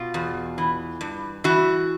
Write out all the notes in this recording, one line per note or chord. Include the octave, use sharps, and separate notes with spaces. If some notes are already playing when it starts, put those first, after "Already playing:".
Already playing: B2 F4
E2
E3
G2
E3 F#4